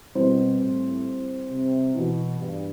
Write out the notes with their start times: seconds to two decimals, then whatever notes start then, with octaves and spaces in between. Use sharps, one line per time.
0.15 B2 G3 C4 E4 G4 C5
0.60 A2
1.50 C3
1.95 B2 E3 B3 F#4
2.40 G2